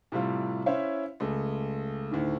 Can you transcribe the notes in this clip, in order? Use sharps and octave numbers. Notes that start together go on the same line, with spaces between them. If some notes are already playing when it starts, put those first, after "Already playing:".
A2 C3 G3 F4
C#4 E4 C5 C#5 E5 F5
C#2 A3 G#4
D2 A2 D#3